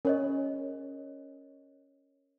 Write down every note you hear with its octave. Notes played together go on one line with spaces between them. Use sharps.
C#4 A#4 C#5 D#5